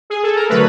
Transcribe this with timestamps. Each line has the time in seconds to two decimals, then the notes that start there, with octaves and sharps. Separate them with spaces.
0.10 G#4
0.23 A4
0.36 A#4
0.49 D3 F#3 A3 B4